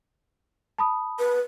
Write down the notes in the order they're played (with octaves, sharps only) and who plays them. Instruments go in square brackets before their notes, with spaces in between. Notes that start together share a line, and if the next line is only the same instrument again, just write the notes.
[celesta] A5 B5 D#6
[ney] B4